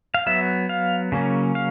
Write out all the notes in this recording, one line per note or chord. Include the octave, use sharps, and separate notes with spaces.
F5
F#3 B3 E5
F5
C#3 F#3 A#3 C#4
F5